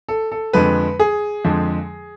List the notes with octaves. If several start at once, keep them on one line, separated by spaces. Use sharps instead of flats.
A4
A4
F2 D3 F3 G#3 B4
G#4
F2 D3 F3 G#3